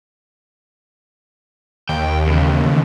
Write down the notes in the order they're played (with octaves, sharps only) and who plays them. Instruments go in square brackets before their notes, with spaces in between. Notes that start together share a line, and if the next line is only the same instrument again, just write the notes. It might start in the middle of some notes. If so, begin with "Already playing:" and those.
[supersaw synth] D#2 [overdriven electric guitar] G5
[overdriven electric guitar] E2 C#3